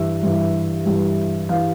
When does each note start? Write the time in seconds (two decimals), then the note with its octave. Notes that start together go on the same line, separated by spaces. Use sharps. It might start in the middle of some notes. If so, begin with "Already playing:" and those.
Already playing: G2 E3 E5
0.23 G2 E3
0.86 G2 E3
1.49 E3 F5